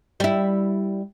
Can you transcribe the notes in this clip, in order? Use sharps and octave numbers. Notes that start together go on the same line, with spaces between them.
G3 E4